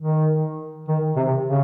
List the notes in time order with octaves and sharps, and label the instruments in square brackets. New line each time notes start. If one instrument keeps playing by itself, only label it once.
[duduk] D#3
D#3
C3
C#3